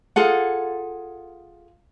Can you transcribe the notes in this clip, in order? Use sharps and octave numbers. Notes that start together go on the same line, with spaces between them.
F4 G#4 A4 F#5